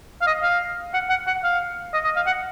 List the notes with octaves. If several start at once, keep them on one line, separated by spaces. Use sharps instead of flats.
F5
D#5
F5
F#5
F#5
F#5
F5
D#5
D#5
F5
F#5